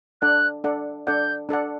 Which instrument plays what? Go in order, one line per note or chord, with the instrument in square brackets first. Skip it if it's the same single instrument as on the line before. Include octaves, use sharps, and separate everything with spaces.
[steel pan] D4 A4 D5 F#5 [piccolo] F#6
[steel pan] D4 A4 D5 F#5
[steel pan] D4 A4 D5 F#5 [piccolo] G6
[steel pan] D4 A4 D5 F#5